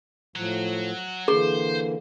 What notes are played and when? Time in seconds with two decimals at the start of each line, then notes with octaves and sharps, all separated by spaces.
0.36 A2 F3 F#3
1.28 D3 E3 A#3 G#4 C5